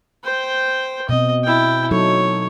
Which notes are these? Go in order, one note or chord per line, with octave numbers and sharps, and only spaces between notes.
C5 G5
B2 C4 D#5
E4 G5
F#3 D#4 A4 C#5